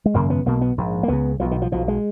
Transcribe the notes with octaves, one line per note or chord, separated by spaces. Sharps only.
G#3
G#1 F#2 C#3 A#3
B3
B1 B2 A#3
B3
A#1 G#2
A#3
C#2 C#3 B3
B1 B2 F3
D#3
F3
B1 B2 F3
G#3